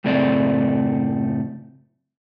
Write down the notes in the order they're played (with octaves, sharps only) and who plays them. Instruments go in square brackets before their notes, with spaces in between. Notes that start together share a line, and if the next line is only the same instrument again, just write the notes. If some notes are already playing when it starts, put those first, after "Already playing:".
[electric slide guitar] F#2 A2 C#3 A3 C4 D5